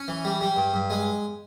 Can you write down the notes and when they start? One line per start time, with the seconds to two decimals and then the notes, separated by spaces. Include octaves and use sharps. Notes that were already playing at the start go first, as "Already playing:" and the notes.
Already playing: C#4
0.08 E3
0.25 G3
0.41 G3
0.56 G2
0.74 G2
0.90 G#3